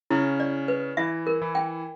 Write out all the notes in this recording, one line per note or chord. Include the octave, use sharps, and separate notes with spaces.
C#3 C#4 E4
D5
B4
E3 E4 E5
A#4
E3 E4
G5